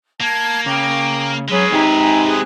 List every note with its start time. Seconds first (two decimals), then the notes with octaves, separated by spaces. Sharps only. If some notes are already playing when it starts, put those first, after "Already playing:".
0.21 A#3 A5 G#6
0.66 C#3 G5 A#5 D6
1.49 F#3 G#3 C#4 G#4 B4 E6
1.72 C4 D#4 G4
2.00 G#5 A#5
2.27 G#4 F#6